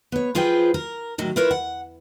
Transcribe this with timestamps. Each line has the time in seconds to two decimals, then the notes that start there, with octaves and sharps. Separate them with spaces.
0.12 B3 C#5
0.35 F3 F4 G#4 B4 C5 G5
0.74 A#4
1.18 A2 D#3 F#3
1.36 E4 F4 A#4 B4 C#5
1.51 F#5